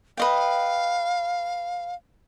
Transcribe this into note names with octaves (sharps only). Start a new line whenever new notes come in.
B4 D#5 F5 G5